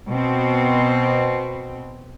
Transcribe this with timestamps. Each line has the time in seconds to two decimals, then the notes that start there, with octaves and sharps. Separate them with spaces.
0.11 B2 C4